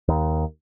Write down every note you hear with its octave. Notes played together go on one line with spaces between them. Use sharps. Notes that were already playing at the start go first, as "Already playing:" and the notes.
D#2